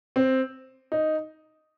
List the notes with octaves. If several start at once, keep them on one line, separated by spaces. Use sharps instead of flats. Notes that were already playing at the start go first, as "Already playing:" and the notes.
C4
D#4